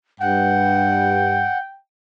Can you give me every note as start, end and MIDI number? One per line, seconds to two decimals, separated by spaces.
0.21 1.49 43
0.21 1.58 78
0.21 1.77 79